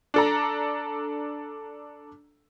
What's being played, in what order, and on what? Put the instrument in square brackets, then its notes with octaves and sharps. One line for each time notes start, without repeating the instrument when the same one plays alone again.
[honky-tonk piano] D4 A4 A#5